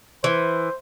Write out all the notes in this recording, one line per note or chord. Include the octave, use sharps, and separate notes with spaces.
E3 C5